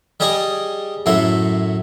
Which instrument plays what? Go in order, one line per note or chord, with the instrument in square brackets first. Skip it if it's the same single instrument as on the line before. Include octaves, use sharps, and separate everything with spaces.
[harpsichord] G3 G#4 D5 D#5
F#2 A2 A3 C6